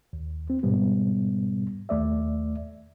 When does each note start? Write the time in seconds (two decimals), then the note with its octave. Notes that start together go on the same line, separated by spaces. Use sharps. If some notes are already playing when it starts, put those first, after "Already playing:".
0.13 D#2
0.50 C4
0.63 G#2 B2 G3 B3
1.89 D#2 A3 D5 E5